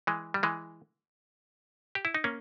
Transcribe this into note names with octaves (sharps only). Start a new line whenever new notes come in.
E3 G#3
G3
E3 G#3
G4
E4
D#4
A#3 C#4